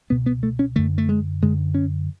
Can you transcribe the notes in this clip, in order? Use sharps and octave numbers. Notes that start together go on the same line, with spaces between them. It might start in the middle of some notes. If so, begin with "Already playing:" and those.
C#2 B2 B3
B3
A3
C#4
F#2 D3 A3
A3
G#3
F#2 D3 G#3
C#4